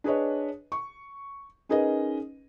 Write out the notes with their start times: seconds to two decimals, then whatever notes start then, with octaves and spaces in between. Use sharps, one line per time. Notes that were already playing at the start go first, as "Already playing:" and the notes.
0.04 D4 G#4 B4 C#5 D#5
0.72 C#6
1.69 C#4 D#4 G#4 A#4 B4 D#5